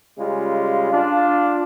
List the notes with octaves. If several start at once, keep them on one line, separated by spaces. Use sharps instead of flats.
C#3 G3 G#3 F4
D4 F4